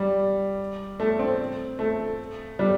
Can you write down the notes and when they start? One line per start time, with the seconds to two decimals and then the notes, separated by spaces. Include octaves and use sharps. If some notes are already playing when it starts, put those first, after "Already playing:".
Already playing: G3
1.00 A3
1.19 C4
1.79 A3
2.59 G3